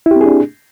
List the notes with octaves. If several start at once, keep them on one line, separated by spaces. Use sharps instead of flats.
C4 D4 E4 G4 G#4